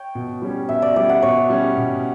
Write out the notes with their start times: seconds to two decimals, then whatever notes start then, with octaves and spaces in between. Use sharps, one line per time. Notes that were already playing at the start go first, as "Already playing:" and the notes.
Already playing: C#5 G5
0.15 B2
0.42 G3 C#4
0.69 B2 E5
0.82 D5
0.96 G3 C#4 D5
1.09 F#5
1.22 B2 C#5
1.49 G3 C#4
1.77 B2